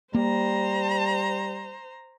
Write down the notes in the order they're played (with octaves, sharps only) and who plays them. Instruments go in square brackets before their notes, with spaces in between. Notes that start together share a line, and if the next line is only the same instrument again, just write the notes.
[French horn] G3 [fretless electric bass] A#3 [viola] C5 A#5